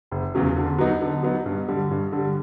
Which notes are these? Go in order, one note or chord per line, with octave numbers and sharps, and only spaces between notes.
F#1
E2 C#3 F#3
D3
F#3 B3 D#4
D3
F#3 B3 D#4
G2
D3 G3
G2
D3 G3